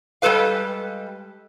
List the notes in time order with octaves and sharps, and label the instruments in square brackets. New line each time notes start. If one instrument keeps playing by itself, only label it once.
[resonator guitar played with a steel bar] G3 G#3 A4 B4 F5